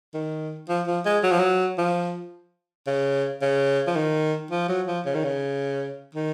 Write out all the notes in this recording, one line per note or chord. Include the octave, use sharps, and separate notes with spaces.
D#3
F3
F3
G#3
F#3
F3
F#3
F3
C#3
C#3
F3
D#3
F3
F#3
F3
C#3
D#3
C#3
D#3